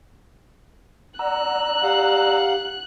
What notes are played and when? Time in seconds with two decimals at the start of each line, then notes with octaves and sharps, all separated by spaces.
1.19 D5 F#5 A#5 E6 F#6
1.82 G4 F5 F#5